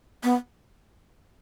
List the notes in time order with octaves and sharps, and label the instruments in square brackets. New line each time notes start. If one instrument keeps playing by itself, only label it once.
[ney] B3